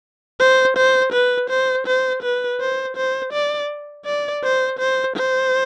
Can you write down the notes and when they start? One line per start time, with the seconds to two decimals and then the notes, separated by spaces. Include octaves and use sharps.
0.40 C5
0.77 C5
1.13 B4
1.50 C5
1.87 C5
2.22 B4
2.60 C5
2.97 C5
3.33 D5
4.06 D5
4.43 C5
4.79 C5
5.16 C5